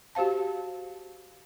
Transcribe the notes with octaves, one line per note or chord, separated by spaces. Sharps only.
F#4 G4 C5 F5 A5